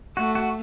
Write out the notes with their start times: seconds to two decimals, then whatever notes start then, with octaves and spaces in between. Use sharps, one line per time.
0.17 A3 F#4
0.35 F#4